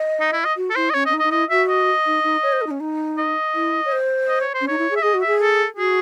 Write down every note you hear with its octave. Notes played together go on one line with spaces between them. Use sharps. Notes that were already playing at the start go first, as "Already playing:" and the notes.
Already playing: D#5
D#4
E4
D#5
F#4
A4
E4 C5
D#5
C#4 C#5
C#4 D#5
D#4
D#5
D#4
E4 D#5
F#4 E5
D#5
D#4
D#4
C#5
C5
A4
D#4
C#4
D#4
D#5
E4
C#5
C5
D#5
C#5
C5
C#4
D#4 C#5
E4
G#4
E5
G#4 D#5
F#4
G#4 E5
A4
F#4 G#4